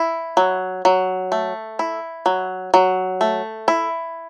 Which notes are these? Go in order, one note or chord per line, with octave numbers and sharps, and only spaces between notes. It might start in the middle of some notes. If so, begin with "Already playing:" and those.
Already playing: E4
F#3
F#3
A3
E4
F#3
F#3
A3
E4